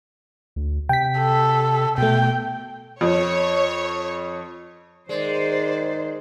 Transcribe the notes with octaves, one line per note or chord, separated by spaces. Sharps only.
D2
C3 G5 B6
A4
B2 A3 G5
F2 C#5
D#3 G#3 C5 D5